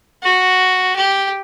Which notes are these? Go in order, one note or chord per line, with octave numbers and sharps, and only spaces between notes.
F#4
G4